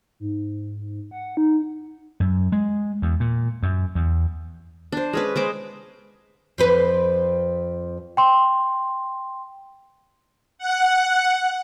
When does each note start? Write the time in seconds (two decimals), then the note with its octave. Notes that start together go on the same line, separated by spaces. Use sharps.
0.20 G#2
1.11 F#5
1.37 D#4
2.20 F#2
2.52 G#3
3.02 E2
3.20 A#2
3.63 F#2
3.95 E2
4.92 D4 C5
5.13 G#3 C#4 B4
5.36 G#3 C5 D6
6.58 F2 C4 B4
8.17 G5 C6
10.58 F#5